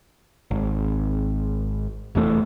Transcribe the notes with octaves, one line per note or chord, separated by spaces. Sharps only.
G#1
F1 E2 C3 A3